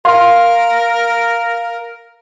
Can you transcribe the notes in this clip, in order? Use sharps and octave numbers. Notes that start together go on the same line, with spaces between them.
A#4 F5 C6